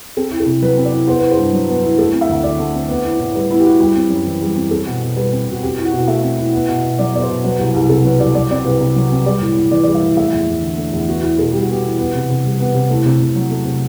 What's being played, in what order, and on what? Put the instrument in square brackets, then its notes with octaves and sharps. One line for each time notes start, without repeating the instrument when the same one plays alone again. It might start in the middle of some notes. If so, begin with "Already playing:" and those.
[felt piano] C4 A4
E4
A4
C3
F#3 B4
C4
D5
E4
B3 C5
E4 B4
C5
G2
F#3
B3
E4
A3 A4
C4
E5
D2
D3 D5
A3
C4
B3
E4
A2
G3 B4
B3 E4
G4
E4 F#4
G3 G4
C4
F#2
E3
G3
C4
C4 A4
B2
B2
G3 B4
C4
B2
F#4
C4 G4
E4
F#4
B2 E4
F#4
A3 E5
C4
E4
B3
B2
B2
F#3 D5
B3 D5
C5
B2
F#3 B4
C2
C2
C3 A4
F#3 B4
C2 D5
F#3 D5
C4 D5
C2 B4
C3
F#3
C4
G3 D5
A2
A2
E3 D5
G3 D5
E5
A2
A3 E5
E2
E2
D3
A3
E2
B3 F#4
E4 F#4
B2 A4
G3 G4
F#4
B3 G4
E4
B3
C3
C3
G3
B3
C3
A3 E4
C3
C3
F#3
A3
C3